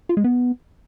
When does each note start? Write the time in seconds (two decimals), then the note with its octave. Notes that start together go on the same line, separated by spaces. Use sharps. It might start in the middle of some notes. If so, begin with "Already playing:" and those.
0.09 F4
0.17 G#3
0.24 B3